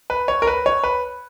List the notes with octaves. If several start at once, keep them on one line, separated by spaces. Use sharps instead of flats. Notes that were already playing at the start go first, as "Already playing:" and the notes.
B4
C#5
A#4
B4
C#5
B4